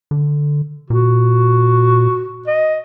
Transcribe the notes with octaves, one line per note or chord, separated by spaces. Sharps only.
D3
A#2 F#4
D#5